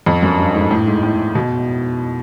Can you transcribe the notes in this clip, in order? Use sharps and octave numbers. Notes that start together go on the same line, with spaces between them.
F2
F#2
G2
G#2
A2
G#2
A2
B2